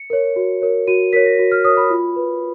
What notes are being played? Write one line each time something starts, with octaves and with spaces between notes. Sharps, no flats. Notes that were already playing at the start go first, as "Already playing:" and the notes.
Already playing: C#7
A#4 C#5
F#4
A#4 C#5
F#4 D#7
A#4 C#5 B6
A#6
F#4
F6
A#4 C#5 D#6
B5
F4
B4